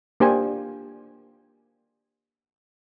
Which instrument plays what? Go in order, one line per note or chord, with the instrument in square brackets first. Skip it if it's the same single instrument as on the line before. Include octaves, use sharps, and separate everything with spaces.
[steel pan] A#3 D4 G4 C5 G#5